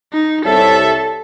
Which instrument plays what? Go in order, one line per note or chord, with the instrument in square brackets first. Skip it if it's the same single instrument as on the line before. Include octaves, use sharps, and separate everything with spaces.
[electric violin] D#4
[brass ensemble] C2 C#5 E5 [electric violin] A4